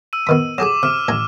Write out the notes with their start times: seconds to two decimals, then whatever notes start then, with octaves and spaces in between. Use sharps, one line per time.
0.13 E6 D#7
0.27 B2 D#3 B5
0.58 F#3 G4 G#4 D6 E7
0.83 C3 F6
1.08 A1 G#5 A#5